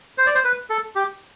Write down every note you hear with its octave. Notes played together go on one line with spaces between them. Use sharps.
C5
D5
C5
B4
A4
G4